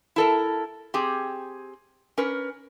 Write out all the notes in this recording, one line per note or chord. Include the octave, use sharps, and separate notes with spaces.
E4 A4 A#4
C4 G4 G#4
C#4 A#4 B4